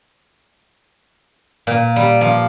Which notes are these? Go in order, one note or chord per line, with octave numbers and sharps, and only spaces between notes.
A#2
G3
F3